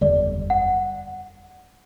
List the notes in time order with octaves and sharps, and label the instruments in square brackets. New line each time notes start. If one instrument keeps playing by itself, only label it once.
[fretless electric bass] F#1 E2 D3 G3 [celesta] D5
[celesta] F#5